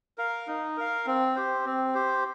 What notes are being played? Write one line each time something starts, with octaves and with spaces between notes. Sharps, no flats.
A#4 F5
D#4
A#4 F5
C4
G4 C5
C4
G4 C5